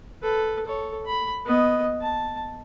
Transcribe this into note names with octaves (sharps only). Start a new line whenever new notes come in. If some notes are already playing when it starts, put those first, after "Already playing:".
A4 B4
A4 C#5
B5
B3 D#5
A5